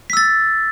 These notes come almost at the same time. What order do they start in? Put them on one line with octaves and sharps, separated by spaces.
B6 E6 A6